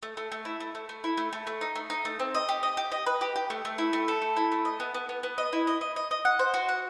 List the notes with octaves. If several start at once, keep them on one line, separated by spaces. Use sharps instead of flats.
A3
A3
A3
E4
A3
A3
A3
E4
A3
A3
A3
D#4
A3
D#4
A3
C4
D#5
G4
D#5
G4
D#5
B4
G4
G4
A3
A3
E4
A3
A4
A3
E4
A3
D#5
B3
B3
B3
B3
D#5
E4
D#5
D#5
D#5
D#5
F#5
C5
F#4
F#5